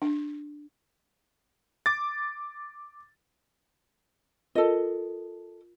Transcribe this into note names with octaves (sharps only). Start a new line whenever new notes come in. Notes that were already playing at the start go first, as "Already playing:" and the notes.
D4
D6 A6
F4 A4 A#4 D#5